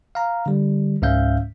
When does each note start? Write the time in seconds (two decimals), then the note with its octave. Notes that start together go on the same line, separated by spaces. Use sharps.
0.15 F5 A#5
0.46 D3 G3
1.02 C#2 G#2 C#4 E5 F5 G6